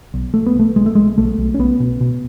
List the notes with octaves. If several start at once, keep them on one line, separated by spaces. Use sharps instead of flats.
B1
B1 A3
B3
B1
A3
B1 G#3
A3
B1 G#3
B1 A3
B1
C#4
B1 B3
B2
B2